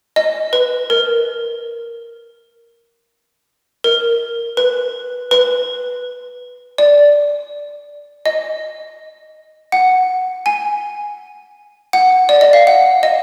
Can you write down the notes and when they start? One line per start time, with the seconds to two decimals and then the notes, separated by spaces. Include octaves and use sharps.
0.16 D#5
0.53 B4
0.90 A#4
3.84 A#4
4.57 B4
5.31 B4
6.78 D5
8.26 D#5
9.72 F#5
10.46 G#5
11.93 F#5
12.29 D5
12.41 D#5
12.53 F5
12.67 F#5
13.03 D#5